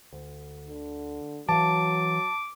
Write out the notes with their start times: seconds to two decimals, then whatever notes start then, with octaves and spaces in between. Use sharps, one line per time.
0.13 D2
0.68 D3
1.49 E3 F#3 F5 A5 D6